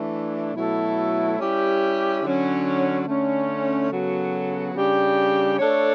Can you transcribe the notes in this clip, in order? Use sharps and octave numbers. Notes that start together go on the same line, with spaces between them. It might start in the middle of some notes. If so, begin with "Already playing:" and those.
Already playing: E3 A3 D4
B2 F#3 A3 E4 A4
G3 C#4 E4 G4
D3 F#3 C#4
D3 A3 C#4
C#3 F#3 B3 F#4 A4
C#3 G3 D4 G4
A3 D4 A4 C#5